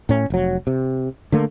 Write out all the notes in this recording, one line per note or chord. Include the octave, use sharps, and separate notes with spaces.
A2 C#4
F1 F#3
C3
D3 A3 A#3